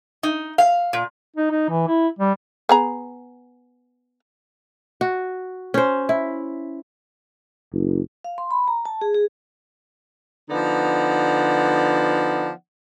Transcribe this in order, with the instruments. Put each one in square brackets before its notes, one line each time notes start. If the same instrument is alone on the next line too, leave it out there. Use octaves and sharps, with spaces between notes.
[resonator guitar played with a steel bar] D#4
F5
A#2
[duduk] D#4
D#4
E3
E4
G3
[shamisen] B3 G#4 A#5
[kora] F#4
C#4 C5
E4
[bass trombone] F#1
[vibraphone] F5
C6
B5
A#5
A5
G#4
G#4
[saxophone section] D3 F3 B3 D#4 D5 F#5